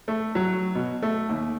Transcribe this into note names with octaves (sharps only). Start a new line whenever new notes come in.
A3
F#3
B2
A3
D#2